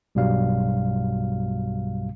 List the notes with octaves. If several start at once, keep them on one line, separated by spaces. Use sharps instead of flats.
B1 G2 B2 F#3 G3 F5